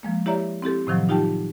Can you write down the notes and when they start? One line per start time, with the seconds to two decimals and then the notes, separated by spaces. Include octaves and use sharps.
0.03 F3 G#3 A#3
0.26 E4 G4 C#5 D5 E5 A#5
0.62 C4 E4 G4 A4
0.87 A2 C3 D#3 F3 F#3
1.09 D#4 F4 G4 G5 A5